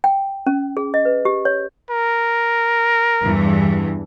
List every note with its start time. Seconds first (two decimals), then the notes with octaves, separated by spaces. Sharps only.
0.04 G5
0.46 C#4
0.77 G#4
0.94 D#5
1.05 B4
1.25 G4
1.45 C#5
1.90 A#4
3.22 E2 G2 E3